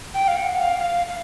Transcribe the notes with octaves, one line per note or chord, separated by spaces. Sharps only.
G5
F5
F#5
F5
F5
F5